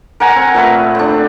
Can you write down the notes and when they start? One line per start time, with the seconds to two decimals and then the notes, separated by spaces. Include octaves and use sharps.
0.20 A#4 F#5 G#5 A#5
0.36 C4
0.54 A#2 A3 B4
0.95 C4 D4